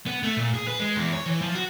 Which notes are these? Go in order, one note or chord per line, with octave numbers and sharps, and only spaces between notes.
B3
A3
A#2
G#4
B4
G#3
E2
C#5
E3
F3
F#4